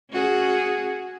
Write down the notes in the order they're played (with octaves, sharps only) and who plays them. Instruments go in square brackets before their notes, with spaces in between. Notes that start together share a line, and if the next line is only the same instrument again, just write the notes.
[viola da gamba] C#4 F#4 G#4